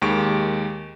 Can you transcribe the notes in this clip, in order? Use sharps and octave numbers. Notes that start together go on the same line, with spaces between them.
D#2 G#3 G4 A#4 C#6 D7